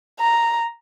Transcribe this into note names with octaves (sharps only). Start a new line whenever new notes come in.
A#5